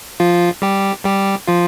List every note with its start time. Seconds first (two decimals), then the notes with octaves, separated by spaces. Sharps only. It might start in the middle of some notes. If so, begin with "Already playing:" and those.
0.20 F3 F4
0.62 G3 G4
1.05 G3 G4
1.47 F3 F4